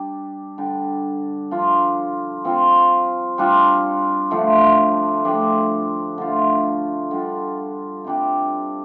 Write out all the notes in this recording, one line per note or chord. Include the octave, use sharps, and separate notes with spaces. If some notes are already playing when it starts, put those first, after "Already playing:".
Already playing: G3 D4 G4
D3 G3 D4 G4
F3 D4 F4
F3 C4 F4
G3 D4 F4
D3 F3 A3 F4
A2 F3 D4 G4
D3 A3 F4
D3 G3 D4 F4
C3 G3 D4 G4